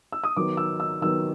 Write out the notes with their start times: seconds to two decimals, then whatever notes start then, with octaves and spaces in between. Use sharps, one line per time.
0.12 E6
0.24 D#6
0.37 D#3 F#3 B3 D6
0.57 E6
0.80 E6
1.02 D#3 F#3 B3 E6